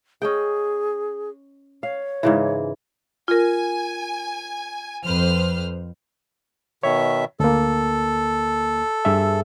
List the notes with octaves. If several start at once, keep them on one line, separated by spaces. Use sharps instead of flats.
C#4 G#4 D#5 G5
C#5 F5
G#2 C#3 E3
F4 A#4 G#5
F2 B4 C5 F6
B2 D#3 C#5 E5
D2 A#3 A4
G2 G#4 E5